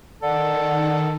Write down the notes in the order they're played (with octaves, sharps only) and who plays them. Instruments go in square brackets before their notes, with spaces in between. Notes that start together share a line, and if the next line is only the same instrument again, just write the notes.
[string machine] D#3 [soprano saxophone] A4 [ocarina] D5 [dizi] F#5